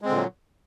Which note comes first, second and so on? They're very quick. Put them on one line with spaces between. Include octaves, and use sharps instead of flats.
G#3 C4 D3 A#2 F#3